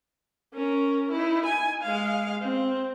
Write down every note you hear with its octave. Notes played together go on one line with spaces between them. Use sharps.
C#4 A#4
D#4 E4
G#5
G#3 F5
C4